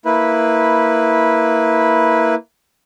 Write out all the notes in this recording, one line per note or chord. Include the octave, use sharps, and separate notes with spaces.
A#3 E4 B4